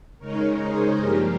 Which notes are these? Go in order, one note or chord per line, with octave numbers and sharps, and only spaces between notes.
C#3 G#3 D#4 A#4 C#5
G#4 C5
G2 F3 A#3 G4 A#4